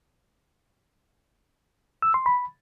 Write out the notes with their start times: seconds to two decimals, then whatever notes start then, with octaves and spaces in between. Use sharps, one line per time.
2.02 E6
2.14 C6
2.26 B5